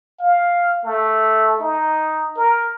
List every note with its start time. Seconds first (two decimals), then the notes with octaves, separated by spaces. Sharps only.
0.20 F5
0.84 A3
1.60 D#4
2.37 A#4